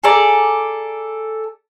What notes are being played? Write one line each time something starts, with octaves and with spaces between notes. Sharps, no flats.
G#4 A4 D5 A#5